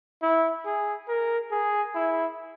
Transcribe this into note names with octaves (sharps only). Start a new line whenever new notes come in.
E4
G#4
A#4
G#4
E4